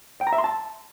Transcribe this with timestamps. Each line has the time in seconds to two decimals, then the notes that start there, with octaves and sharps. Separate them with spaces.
0.21 G5
0.27 A#5
0.33 E5
0.38 C6
0.44 A5